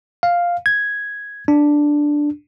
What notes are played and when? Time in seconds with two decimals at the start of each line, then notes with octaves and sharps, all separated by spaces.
0.23 F5
0.66 G#6
1.48 D4